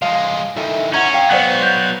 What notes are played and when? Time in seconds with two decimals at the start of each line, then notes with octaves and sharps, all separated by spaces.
0.02 F3 G#3 F5 F7
0.56 D#3 E3 A4 E5
0.94 G#3 C#4 F#5 A#5 G#6
1.14 F5 G5
1.30 F#3 B3 C5 D5 F#5
1.62 G6